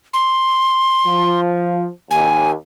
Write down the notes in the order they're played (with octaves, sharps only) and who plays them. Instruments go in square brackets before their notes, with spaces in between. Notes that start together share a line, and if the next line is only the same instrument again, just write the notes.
[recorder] C6
[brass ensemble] F3
[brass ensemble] D#2 [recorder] G#5